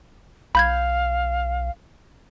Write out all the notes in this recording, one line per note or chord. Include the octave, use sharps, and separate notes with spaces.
B1 F5 B5 G6 G#6